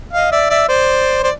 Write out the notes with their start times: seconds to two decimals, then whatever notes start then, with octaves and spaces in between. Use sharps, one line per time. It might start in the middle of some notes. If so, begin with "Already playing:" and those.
0.13 D#5 F5
0.32 D5 E5
0.50 D5 E5
0.68 C5 D5
1.23 C5 D5